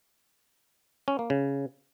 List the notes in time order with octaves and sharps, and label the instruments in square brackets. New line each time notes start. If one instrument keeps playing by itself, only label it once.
[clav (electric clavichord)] C#4
A#3
C#3